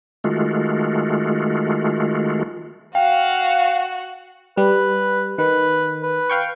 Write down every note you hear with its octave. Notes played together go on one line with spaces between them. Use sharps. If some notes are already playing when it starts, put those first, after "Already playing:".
D#3 G#3 A3 F4 F#4
F#4 F5 G5
G3 B4
D#3 B4
B4
F5 G5 C#6